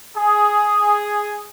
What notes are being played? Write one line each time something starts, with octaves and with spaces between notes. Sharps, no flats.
G#4